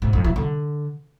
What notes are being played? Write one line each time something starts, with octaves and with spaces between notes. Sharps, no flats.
G#2
F2
E3
D3